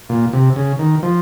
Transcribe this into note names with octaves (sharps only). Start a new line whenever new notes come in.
A#2
C3
C#3
D#3
F3